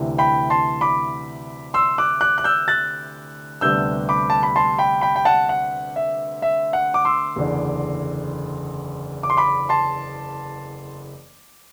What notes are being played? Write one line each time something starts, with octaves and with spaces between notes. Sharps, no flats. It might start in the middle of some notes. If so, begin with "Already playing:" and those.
Already playing: D2 C3 E3
G5 B5
A5 C6
B5 D6
C6 E6
D6 F#6
D6 F#6
F#6
E6 G6
F#6 A6
D2 C3 G3 B3 D4 E6 G6
B5 D6
A5
B5
A5 C6
G5 B5
G5 B5
G5
F#5 A5
F#5
E5
E5
F#5
D6
C6 E6
F#1 E2 D3
D6
C6
B5 D6
A5 C6